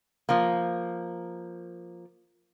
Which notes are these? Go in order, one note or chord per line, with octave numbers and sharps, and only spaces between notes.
F3 A#3